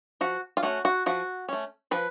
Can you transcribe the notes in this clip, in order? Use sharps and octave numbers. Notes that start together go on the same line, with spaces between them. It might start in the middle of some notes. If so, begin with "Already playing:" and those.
F3 F#4
F4
A3 C#4 F#4
F#4
F3 F#4
A3 C#4
F3 B4